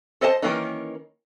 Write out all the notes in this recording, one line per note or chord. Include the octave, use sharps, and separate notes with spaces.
A4 C5 D#5 F#5 A5
D#3 E3 A#3 C#4 D#4